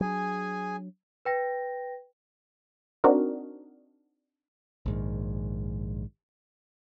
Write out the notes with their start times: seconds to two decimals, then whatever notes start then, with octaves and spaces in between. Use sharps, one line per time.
0.01 F#3 D4 G#4 G#5
1.25 B4 G5 A#6
3.04 C4 D4 D#4 F#4 A#4
4.86 A#1 G#2 D#3